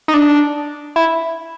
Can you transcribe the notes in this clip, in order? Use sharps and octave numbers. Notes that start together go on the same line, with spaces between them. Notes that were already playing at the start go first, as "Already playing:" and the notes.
D#4
D4
E4